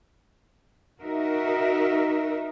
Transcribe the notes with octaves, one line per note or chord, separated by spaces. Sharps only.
D#4 F#4 A#4 E5